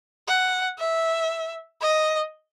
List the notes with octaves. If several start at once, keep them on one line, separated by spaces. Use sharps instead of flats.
F#5
E5
D#5